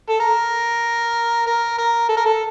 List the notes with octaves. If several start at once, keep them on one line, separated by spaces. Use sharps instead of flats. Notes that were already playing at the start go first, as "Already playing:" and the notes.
A4
A#4
A#4
A#4
A4
A#4
A4